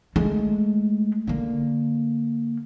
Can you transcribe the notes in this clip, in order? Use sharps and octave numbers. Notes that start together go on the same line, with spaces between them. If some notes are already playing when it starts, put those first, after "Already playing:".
G#3 A3
D3 A#3